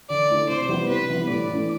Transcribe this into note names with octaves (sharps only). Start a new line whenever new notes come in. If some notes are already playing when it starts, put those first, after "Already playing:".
D3 D5
A3 E4 A4
C3 C5
G3 B3 E4
C3 B4
G3 B3 E4
A2 D5
E3 A3 D4